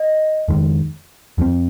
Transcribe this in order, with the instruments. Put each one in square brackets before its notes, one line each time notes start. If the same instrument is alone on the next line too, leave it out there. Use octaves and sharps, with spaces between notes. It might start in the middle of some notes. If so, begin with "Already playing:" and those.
Already playing: [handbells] D#5
[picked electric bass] F2 D#3 G#3
F2 F3 G#3 C4